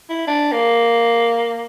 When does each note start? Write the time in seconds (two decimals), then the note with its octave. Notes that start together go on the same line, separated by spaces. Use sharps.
0.10 E4
0.27 D4
0.52 A#3